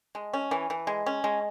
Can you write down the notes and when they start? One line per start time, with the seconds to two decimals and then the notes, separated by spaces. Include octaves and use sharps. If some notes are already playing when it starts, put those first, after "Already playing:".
0.15 G#3
0.34 C#4
0.51 E3
0.70 E3
0.87 G#3
1.06 C#4
1.24 G#3